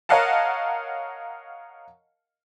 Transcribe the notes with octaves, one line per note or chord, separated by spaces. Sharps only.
A#4 C#5 D#5 F5 F#5 A5